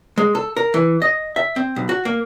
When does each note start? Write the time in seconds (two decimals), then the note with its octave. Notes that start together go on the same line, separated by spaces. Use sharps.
0.18 G#3
0.35 A4
0.57 A#4
0.74 E3
1.02 D#5
1.36 E5
1.56 C4
1.76 B1
1.89 F#4
2.05 A#3